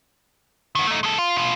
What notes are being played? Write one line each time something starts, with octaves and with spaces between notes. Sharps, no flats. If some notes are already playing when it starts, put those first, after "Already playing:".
D#3 B3
A3 D#4
G#3 A4
F4
B2 F4